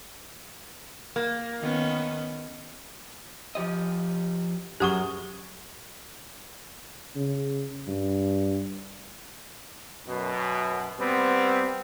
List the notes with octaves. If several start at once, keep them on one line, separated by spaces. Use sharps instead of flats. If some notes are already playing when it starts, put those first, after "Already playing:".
A#3
D#3 B3 C#4
F3 G4 D#5
F#2 G4 G#4 F#5 C#6 D#6 G7
C#3
G2
F#2 B2
G3 B3 C4